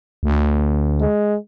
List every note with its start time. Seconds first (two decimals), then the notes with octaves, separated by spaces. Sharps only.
0.23 D2
1.00 G#3